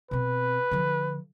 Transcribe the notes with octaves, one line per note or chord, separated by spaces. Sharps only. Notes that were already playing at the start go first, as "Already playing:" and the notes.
B2 C4 B4
D3 F3